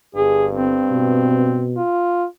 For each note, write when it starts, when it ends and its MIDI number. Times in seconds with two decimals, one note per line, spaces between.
0.15 0.77 31
0.15 1.62 43
0.15 0.46 68
0.52 1.72 60
0.91 1.78 47
1.77 2.25 65